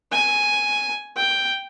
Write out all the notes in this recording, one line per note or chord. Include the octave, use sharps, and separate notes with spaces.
G#5
G5